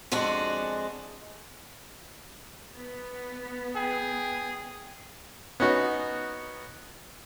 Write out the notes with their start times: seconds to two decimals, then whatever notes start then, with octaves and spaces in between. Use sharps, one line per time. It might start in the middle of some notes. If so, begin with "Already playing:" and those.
0.12 F2 G#3 D4 F#4
2.75 B3
3.76 G#4 G5
5.60 B3 C#4 D#4 F#4